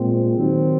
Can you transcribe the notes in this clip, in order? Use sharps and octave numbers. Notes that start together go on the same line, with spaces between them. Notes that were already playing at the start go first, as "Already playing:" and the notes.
Already playing: A#2 G#3 C4
D#3 F#3 C4